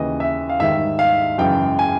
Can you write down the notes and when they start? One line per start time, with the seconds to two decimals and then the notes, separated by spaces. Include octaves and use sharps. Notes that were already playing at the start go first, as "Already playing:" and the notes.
Already playing: D#2 C#3 E3 D#5
0.20 E5
0.49 F5
0.60 G#2 D#3 G3 E5
0.99 F5
1.38 F#2 C#3 E3 G#3 G5
1.79 G#5